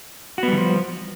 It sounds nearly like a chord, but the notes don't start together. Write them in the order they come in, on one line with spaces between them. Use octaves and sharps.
F#4 B3 G3 E3 F3